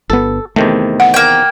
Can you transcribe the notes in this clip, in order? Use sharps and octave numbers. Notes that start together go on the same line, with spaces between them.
G1 B3 A4
E2 C3 D#3 A3
F#5
A#3 G5